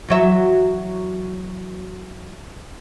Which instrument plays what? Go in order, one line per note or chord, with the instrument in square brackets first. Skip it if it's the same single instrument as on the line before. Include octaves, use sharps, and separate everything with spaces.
[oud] E2 F#3 E5